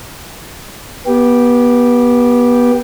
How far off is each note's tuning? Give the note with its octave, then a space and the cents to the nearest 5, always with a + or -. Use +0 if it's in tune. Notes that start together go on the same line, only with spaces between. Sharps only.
B3 -25 G4 +0